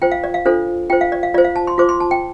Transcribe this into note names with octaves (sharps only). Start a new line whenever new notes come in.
F4 C5 G5
F5
D5
F5
D4 F4 A4 C5
F4 C5 G5
F5
D5
F5
F4 C5 D5
F5
A5
C6
F4 C5 D6
C6
A5
G5